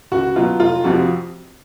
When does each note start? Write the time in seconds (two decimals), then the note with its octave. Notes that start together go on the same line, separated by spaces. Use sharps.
0.12 C#2 F#4
0.36 B2 F#3 F4
0.60 F1 F4
0.84 F2 C3 F3 F#4